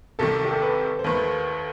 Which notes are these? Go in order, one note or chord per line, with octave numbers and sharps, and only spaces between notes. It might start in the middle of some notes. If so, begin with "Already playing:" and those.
C2 C3 D#3 A4
G4
A4
B4
C5
D#2 D#3 A3 B4